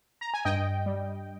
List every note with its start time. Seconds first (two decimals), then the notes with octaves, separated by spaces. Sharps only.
0.21 A#5
0.34 G#5
0.45 G2 D#5 G5
0.86 G3